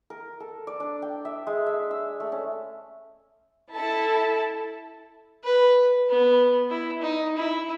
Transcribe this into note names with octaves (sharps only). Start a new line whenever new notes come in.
A#4
A4
D5
D4
G5
E5
G#3
E5
E6
A3
C#4
E4 A4 A5
B4
B3
E4
D#4
E4